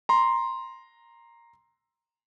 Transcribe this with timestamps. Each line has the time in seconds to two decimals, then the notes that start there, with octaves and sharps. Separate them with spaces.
0.09 A#5 C6